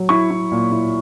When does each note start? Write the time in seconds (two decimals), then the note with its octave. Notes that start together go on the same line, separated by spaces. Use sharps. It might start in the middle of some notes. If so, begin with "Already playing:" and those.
Already playing: F#3
0.09 E4 C#6
0.31 E4
0.51 A#2
0.72 E4